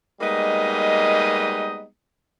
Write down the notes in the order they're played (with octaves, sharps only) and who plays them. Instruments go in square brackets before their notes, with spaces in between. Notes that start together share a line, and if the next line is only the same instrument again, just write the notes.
[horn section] G3 G#3 A#3 B3 D#4 D#5